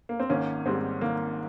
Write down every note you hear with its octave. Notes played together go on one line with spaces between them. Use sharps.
A#3
C4
G#1 A#3 C#4
G#2 G3 C4
G#1 A#3